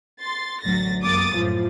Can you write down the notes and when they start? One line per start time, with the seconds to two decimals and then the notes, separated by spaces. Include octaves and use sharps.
0.22 C6 A6
0.65 A1 D2 F#3 A6 A#6
1.02 F#2 A#3 D6 D#6 A6
1.35 F#2 A2 F3